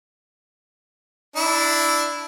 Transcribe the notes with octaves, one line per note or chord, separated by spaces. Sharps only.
D4 E4